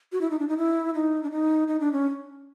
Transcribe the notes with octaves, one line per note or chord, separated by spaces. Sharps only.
F#4
E4
D#4
D4
D#4
E4
D#4
D4
D#4
D#4
D4
C#4